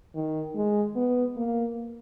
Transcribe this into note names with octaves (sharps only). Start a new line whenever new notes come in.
D#3
G#3
B3
A#3